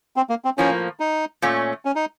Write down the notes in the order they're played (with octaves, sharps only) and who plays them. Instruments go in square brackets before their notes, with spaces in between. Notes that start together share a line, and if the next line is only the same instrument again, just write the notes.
[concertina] C4
A#3
C4
[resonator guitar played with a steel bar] A2 F3 A#3 [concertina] C#4
[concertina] D#4
[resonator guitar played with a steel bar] A#2 A3 C#4
[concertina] C#4
D#4